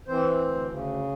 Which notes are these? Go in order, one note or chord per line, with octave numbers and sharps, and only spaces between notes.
E3 C4 C5
D2
C#3